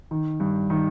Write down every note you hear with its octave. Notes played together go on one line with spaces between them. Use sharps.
D#3
G2
D#3